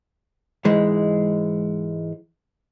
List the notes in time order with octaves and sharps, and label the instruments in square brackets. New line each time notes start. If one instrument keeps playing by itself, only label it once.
[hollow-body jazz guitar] G#2 E3 G#3